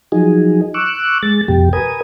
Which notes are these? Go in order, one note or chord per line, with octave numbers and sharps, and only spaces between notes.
F3 F#3 D#4 G#4
C#6 D6 E6 F#6
G#3 A6
F2 B2 G4
A#4 B4 G#5 D#6